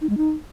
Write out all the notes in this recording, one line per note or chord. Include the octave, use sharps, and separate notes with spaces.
D#4
G#3
D#4